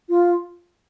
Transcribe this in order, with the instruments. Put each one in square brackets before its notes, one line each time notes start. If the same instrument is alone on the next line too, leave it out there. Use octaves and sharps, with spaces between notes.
[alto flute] F4